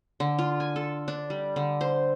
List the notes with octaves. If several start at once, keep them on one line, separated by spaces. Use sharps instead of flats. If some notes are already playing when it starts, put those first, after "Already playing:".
D3
F4
G#5
A4
D4
G3
D3
C5